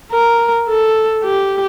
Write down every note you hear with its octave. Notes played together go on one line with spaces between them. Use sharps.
A#4
A4
G4